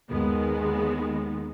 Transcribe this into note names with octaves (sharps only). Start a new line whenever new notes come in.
D#2 D#3 G#3 B3